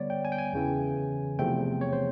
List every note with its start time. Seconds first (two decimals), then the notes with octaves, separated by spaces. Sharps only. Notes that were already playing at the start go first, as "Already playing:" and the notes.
Already playing: D3 G3 B3 C#5 D5
0.10 G5
0.25 G#5
0.32 G5
0.38 G#5
0.53 E2 C#3 E3
1.39 E2 C3 F3 A3 C4 G5
1.81 C#5
1.93 C5